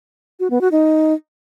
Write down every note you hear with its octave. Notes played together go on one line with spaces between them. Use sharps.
F#4
B3
F#4
D#4